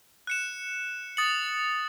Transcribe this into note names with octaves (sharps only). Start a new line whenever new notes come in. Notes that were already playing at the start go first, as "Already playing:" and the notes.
F#6 C#7 E7
D#6 A6 C#7 F#7